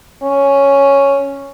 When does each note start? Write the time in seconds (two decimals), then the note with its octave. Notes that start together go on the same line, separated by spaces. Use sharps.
0.23 C#4